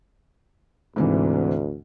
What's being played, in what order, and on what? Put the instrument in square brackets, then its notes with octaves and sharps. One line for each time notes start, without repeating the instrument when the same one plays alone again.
[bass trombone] D2 [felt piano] G#2 C3 E3